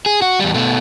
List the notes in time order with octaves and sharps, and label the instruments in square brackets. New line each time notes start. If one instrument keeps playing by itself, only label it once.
[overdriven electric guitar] G#4
F#4
E2 G3
B2 A3